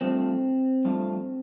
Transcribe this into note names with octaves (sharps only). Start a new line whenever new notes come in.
G2 F3 A3 C4
G2 F3 A3